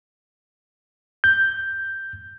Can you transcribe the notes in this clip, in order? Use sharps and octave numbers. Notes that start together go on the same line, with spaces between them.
G6